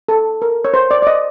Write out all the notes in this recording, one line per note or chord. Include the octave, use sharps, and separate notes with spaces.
A4
A#4
C#5
C5
D5
D5
D#5